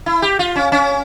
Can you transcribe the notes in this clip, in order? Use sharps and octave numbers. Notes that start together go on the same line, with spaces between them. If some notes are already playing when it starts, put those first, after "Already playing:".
E4
G4
F4
C#4
C#4